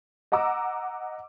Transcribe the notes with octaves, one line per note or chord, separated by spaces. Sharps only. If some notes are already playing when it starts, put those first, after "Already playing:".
D#5 F#5 A#5 D6 E6